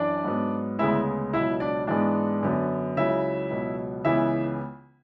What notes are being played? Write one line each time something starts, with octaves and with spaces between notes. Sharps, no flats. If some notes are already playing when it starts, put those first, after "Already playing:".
Already playing: F#2 E3 D4 D5
G#2 F#3 B3
D2 C#3 G#3 B3 E4 E5
C#2 B2 F#3 E4 E5
D4 D5
G#2 E3 G#3 B3 D4 D5
F#2 D3 F#3 B3
C#2 C#3 F#3 E4 E5
C#2 B2 F#3
C#2 C#3 E3 B3 E4 E5